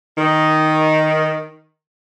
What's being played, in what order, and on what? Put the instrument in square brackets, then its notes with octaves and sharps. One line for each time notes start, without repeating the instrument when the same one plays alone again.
[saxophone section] D#3